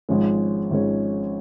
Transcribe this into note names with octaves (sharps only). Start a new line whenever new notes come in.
G#1 G#2 F3 G#3 C#4
G#1 G#2 F3 G#3 C#4